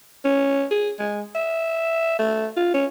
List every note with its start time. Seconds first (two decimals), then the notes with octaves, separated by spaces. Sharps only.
0.24 C#4
0.71 G#4
0.99 G#3
1.35 E5
2.19 A3
2.56 F4
2.74 C#4